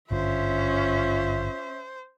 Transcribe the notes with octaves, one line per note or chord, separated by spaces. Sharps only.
G#1 G2 D3 C#4 F4 C5 E5